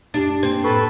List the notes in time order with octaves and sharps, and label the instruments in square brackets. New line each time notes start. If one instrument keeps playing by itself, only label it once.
[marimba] F#2 G4 A6 [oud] D4
[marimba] A#3 [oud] C4
[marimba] A2 C#6 [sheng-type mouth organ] A4 B4